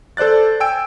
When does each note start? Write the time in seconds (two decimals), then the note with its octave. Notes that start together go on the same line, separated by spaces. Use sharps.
0.17 A4 C5 D5 F#6 A6
0.60 G5 G#5 E6 D7